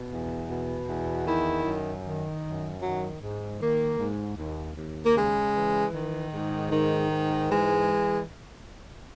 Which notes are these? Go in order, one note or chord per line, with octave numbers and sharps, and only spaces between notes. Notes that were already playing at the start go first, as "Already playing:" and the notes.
Already playing: B2
E2
B2
E2
D#3 E4
F#2
D#3
F#2
D#3 F#3
G#2
D#3 A#3
G#2
D#2
D#2
A#3
C#3 G#3
E3
D#3
G#2
D#3
G#2
E3 G#3